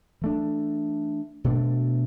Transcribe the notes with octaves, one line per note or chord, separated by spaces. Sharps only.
E3 A3 D4
B2 A3 D4